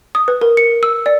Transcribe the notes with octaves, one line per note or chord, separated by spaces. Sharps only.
D#6
B4
A#4
C#7
E6
D5